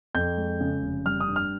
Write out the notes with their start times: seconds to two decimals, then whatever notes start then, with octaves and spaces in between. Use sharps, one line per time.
0.14 F2 G6
0.37 G#3
0.61 C#3
0.82 F1
1.06 G3 F6
1.20 D#6
1.28 G2
1.36 F6